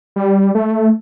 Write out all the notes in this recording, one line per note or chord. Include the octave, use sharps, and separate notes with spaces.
G3
A3